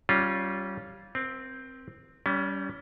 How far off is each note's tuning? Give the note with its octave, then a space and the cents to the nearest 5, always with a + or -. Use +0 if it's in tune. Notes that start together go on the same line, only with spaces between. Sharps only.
G3 -20 C#4 +0 F4 +0
C4 +0 A#4 +45
G3 -10 C#4 +30